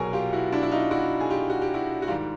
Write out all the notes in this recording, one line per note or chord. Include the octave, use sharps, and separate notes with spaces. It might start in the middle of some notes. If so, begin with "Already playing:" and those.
Already playing: C2 B2 F#3 G#4 A#4
F4 G4
E4 F#4
D4 E4
E4
D#4 F4
E4 F#4
G#4
F4 G4
F#4
G4
E4 F#4
F#4
G#2 D#3 G3 F4 G4